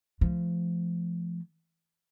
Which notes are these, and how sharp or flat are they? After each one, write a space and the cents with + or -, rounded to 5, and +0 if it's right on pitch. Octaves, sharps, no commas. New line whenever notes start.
F3 -25 A3 -25